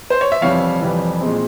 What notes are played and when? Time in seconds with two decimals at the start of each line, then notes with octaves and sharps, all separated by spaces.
0.10 C5
0.21 C#5
0.32 E5
0.41 F2 C3 E3 G3 C#5 F5
0.81 F2 C3 E3 G3
1.21 A#2 G#3 C4